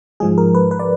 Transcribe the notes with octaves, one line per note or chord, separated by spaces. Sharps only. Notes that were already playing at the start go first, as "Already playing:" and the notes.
G#2 F3 G#3 G#4
A#4
B4
B4
D5